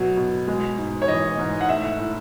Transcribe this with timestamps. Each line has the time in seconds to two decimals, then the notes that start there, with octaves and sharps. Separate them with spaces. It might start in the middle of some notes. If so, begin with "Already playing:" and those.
Already playing: B2 F#3 A3
0.17 B2
0.48 G#3
0.78 G#2
1.02 C#5
1.08 E3 D#5
1.38 G#2
1.61 F#5
1.69 A3 E5
1.98 A2